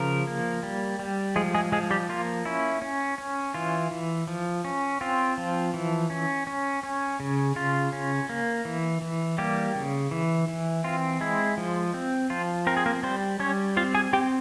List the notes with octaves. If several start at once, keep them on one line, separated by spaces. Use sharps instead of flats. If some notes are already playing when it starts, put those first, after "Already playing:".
Already playing: C#3 F3 A#4
A#3
G3
G3
F3 G#3 G#4
G#3 G#4
F3 G#3 G#4
G3 G4
A#3 F4
C#4 E4
C#4
C#4
E3 F4
E3
F3
C#4
C4 F4
F3
E3
C#4
C#4
C#4
C#3
C#3 F4
C#4
A#3
E3
E3
G3 A#3 G4
C#3
E3
E3
C4 F4
G#3 E4
F3
C4
F3 F4
C4 A#4
G#4
A#3 A#4
G3 C4 C5
G3 C#4 C#5
C4 F4 F5
G#4 G#5
C4 G4 G5